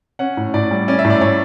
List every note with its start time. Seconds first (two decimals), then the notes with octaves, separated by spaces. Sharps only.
0.19 C#4 F#5
0.37 A2
0.54 A2 D5
0.71 G3
0.88 C#4 D5
0.99 E5
1.05 A2
1.10 D5
1.21 A2 C#5